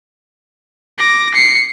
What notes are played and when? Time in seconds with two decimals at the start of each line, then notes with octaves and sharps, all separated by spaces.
0.99 D6 A#6
1.34 C7 C#7